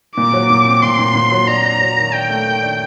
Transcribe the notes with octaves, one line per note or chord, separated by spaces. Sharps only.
A#2 D6
F#3
A#2
C4
A#2 C6
A#2
A#2
F#3
D4 A#5
D4
F#3
D#3
D4 G5
A3
D#3
D4